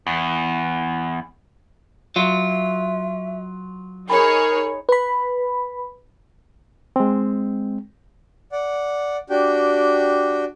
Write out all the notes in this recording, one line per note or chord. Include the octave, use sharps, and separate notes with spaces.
E2
F#3 F4 E5
D#4 G#4 A#4 C#5 B5
B4 B5
G#3 C4
D5 F#5
D4 F#4 G4 G5